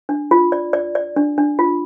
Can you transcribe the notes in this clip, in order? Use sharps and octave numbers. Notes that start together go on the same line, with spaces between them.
D4
F4
D5
D5
D5
D4
D4
F4